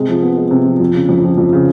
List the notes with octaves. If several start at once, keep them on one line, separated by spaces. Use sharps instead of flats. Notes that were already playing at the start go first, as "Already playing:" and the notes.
Already playing: C3 G#3
F3
B3
G#3
C3
F3
F2
C#3
F2
F3
F2
C#3